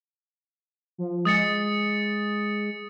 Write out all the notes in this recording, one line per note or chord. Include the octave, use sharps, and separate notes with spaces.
F3
G#3 D#6 A6 C#7